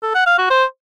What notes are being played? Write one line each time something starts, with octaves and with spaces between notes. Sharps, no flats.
A4
F#5
F5
F#4
C5